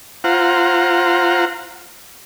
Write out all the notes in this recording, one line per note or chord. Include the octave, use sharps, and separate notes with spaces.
F4 C5 F#5 A#5